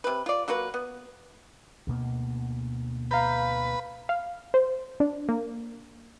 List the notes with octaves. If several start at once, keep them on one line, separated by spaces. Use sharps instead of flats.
C3 B4
F4 D5
F#3 A#3 F#4 B4
B3
D2 B2 A#3
B4 F5 A#5 G6
F5
C5
D4
A#3